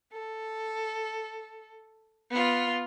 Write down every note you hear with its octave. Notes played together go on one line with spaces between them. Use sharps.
A4
B3 F4